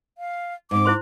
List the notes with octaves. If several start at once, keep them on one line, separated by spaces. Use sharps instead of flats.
F5
G#2 C4 D6
E4 C5 C6